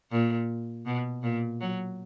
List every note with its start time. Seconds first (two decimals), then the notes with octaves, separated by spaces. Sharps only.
0.11 A#2
0.86 B2
1.23 A#2
1.61 F#3